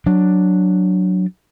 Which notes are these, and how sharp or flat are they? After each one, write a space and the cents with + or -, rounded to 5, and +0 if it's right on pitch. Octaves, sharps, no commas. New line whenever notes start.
F#3 +0 D4 +5